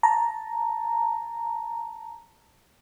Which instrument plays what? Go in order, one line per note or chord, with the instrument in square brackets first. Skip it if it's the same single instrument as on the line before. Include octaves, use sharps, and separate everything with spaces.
[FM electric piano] A5 A#5